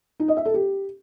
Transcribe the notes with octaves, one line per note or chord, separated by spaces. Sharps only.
D#4
D#5
E5
A4
G4